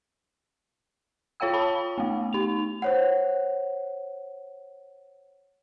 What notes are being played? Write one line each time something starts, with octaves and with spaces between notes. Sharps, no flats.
F4 C#5 F5 G5 E6
A5 B5
A3 B3
D#4 F7
C5 C#5 F#5